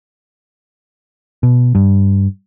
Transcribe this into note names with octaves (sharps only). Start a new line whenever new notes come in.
B2
G2